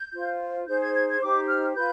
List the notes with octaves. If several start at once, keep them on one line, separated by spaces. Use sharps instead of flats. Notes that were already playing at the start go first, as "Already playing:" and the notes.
Already playing: G6
F4 C5
D#4 G#4 C5 G6
G#6
G#6
G#6
D#4 G4 C5 D6
F6
F4 B4 G6